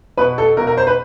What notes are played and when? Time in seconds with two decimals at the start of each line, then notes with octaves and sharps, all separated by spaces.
0.17 B2 B4
0.38 A4
0.57 B2 A#4
0.67 A#4
0.77 C5
0.87 B4